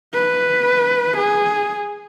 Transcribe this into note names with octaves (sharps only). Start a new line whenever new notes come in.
B4
G#4